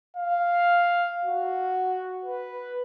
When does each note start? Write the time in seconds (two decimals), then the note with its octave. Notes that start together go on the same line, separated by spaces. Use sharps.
0.17 F5
1.25 F#4
2.25 B4